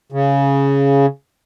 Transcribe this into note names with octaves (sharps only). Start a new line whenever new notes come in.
C#3